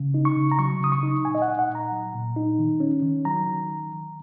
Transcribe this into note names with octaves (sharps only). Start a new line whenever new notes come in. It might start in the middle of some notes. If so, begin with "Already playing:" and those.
Already playing: C#3
D#4
C#6
C#3
A#5
F#3 C#6
C#3 D#6
C#6
D#4
A#2 G#5
D#5
F#5
D#4
F#5
A#2
A#5
F#3
A#2
D#4
D#3
C#4
D#3
F#3 A#5
D#3